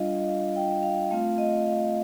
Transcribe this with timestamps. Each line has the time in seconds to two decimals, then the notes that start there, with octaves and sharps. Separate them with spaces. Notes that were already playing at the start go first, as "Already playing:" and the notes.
Already playing: G3 D4 F4 D#5 F5
0.21 D#5
0.28 F5
0.56 G5
0.83 F5
1.10 A3 C4 F4 F5
1.38 D#5
1.67 F5